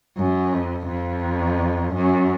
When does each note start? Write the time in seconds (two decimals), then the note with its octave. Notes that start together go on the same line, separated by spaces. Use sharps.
0.17 F#2
0.53 F2
0.88 F2
1.95 F#2